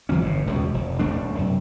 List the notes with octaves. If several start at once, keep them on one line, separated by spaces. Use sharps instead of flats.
C#3 E3 F#3 C#4
G1 A2
E1 C#2 F#2
F1
D#1 E2 A3 D4
F#2 C3